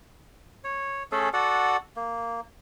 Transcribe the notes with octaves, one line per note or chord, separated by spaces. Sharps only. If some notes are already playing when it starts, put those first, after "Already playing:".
C#5
A3 C#4 G#4 A4
F#4 A4 D5 F#5
A#3